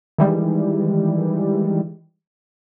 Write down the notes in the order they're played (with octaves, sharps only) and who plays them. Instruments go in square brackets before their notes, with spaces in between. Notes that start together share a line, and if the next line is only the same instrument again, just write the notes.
[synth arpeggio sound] D#3 E3 G3 G#3